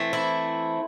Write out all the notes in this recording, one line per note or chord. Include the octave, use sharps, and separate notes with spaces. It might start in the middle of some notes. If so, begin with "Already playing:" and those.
Already playing: E3 A3 C4
E4